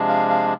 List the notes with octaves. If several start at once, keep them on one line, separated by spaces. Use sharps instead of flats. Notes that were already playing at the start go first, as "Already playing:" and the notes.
Already playing: C3 F3 G#3 D4
F5
F5